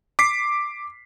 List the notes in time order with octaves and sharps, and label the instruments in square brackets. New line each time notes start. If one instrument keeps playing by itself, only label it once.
[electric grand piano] D6 B6 C7